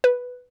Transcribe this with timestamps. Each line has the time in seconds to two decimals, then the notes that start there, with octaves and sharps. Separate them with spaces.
0.04 B4